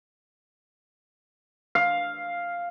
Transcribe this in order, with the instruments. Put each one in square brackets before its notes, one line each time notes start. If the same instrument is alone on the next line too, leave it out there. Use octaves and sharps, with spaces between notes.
[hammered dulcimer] F5